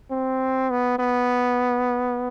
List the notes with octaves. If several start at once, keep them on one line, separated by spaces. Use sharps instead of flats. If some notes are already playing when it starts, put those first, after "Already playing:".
C4
B3
B3